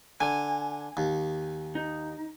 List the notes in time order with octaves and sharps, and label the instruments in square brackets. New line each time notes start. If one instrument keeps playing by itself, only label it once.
[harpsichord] D3 [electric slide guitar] G#5
[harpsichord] D#2
[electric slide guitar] D#4